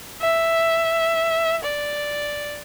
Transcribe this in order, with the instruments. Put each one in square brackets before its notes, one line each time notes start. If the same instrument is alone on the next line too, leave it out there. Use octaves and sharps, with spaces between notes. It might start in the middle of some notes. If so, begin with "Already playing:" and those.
[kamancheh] E5
D5